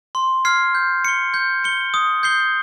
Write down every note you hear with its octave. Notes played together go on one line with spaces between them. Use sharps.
C6
F6 G#6 C7
G6
C#7 G7
G6
C#7 G7
D#6
G6 C7 G7